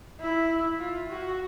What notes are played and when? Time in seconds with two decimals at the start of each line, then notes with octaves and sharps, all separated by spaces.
0.20 E4
0.79 F4
1.09 F#4